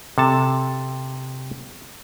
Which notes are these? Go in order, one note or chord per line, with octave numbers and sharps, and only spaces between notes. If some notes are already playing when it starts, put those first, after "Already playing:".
C3 A4 A5